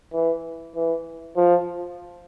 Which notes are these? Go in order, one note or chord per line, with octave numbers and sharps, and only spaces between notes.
E3
E3
F3